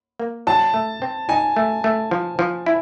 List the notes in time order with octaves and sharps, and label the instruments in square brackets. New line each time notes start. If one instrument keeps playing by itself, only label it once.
[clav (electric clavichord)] A#3
[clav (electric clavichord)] F#3 [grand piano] A5
[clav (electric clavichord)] A3
C4
[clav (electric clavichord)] D#4 [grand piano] G#5
[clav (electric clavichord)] A3
A3
F3
F3
E4